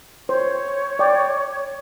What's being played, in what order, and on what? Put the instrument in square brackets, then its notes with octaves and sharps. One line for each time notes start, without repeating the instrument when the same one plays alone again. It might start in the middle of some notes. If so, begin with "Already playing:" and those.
[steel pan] C5 [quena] C#5
[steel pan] D5 G5